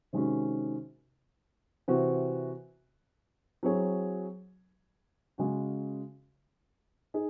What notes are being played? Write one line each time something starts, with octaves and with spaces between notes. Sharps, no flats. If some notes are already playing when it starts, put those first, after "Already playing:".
C3 D#3 G#3 C#4 F#4
C3 E3 C4 F#4
F#3 C4 E4 G#4 C#5
C#3 G#3 C#4 F#4
D#4 G#4